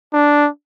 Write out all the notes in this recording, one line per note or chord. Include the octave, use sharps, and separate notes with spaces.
D4